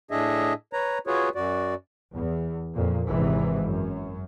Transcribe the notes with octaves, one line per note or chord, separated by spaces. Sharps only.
A2 D4 G#4 D#5 E5
B4 C#5 A#5
F4 F#4 G#4 B4 C#5
F#2 F#4 D5
E2
F2 A#2
G#1 C3 E3
F#2